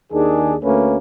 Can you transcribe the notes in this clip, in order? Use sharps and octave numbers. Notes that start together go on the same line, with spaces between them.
D#2 D#3 D4 G#4
D2 A3 A#3 C#4 B4